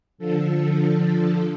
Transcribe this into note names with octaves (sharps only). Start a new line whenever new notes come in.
D3 F3 A4